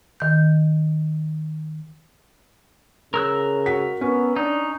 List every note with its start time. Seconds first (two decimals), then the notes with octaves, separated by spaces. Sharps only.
0.20 D#3 G6
3.14 C#3 A#4 E6 F#6
3.66 F#4 B6
4.01 B3 C#4
4.36 D4 D#4